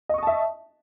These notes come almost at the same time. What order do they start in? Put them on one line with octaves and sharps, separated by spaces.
D#5 C#6 D#6 A5 E5